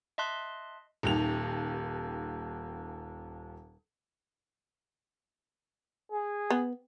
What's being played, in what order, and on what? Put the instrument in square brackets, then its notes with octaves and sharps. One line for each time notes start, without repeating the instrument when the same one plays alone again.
[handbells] D#5 E5 A5 C6 F#6
[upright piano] D#1 D#2 F7
[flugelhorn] G#4
[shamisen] B3